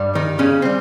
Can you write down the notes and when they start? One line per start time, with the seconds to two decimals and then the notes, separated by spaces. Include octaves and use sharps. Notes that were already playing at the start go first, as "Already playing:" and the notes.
Already playing: G2 G3
0.15 D#3 D#4
0.39 C#3 C#4
0.62 G3 C4